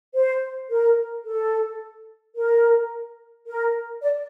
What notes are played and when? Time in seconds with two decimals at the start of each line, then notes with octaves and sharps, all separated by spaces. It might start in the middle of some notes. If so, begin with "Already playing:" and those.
0.15 C5
0.70 A#4
1.25 A4
2.35 A#4
3.46 A#4
4.01 D5